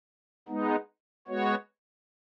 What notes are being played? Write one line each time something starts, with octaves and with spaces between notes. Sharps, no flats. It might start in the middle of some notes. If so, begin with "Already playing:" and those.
G#3 B3 D#4
G#3 B3 F#4 C#5